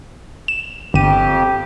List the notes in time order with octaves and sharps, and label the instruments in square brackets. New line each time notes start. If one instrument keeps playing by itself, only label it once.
[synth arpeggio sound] E7
[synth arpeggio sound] G1 D#7 [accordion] F2 G4